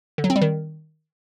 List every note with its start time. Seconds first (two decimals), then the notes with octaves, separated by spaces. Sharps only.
0.18 D3
0.24 F#3
0.30 C4
0.36 G3
0.42 D#3